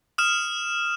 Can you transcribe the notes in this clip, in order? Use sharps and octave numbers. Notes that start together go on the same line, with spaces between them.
D#6 F6 E7